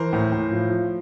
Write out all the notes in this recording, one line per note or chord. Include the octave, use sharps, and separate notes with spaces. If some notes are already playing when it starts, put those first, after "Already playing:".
Already playing: E3 A#4 C5
A2
A2
F3
F3